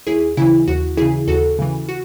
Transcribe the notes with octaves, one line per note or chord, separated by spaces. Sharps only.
D#2 E4 G#4
C#3 E3 E4
D#2 F#4
C#3 E3 E4 G#4
D#2 F#4 A4
C#3 E3
F#4